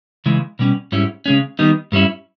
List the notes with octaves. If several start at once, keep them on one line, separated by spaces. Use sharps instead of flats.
C#3 E3 G#3
B2 G3 C#4
G#2 G3 C#4 E4
C#3 G#3 C#4
D#3 G3 B3 D#4
G2 G3 C#4 E4